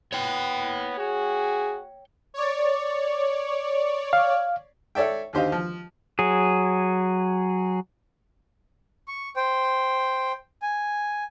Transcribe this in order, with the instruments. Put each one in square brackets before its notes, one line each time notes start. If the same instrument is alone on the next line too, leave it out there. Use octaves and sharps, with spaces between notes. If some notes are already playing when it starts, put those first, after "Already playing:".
[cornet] B3 [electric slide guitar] C#5 G5
[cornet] F#4 [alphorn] G#4
[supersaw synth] C#5 D5
[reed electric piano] F5
[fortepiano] A4 C#5 D5 E5 G5
D#2 D3 G4 C5 D#5 F5
F3
[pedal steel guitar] F#3 G#4
[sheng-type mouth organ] C#6
C5 G5
G#5